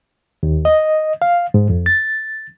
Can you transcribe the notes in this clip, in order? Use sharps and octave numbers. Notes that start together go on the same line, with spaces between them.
D#2
D#5
F5
G#2
F2
A6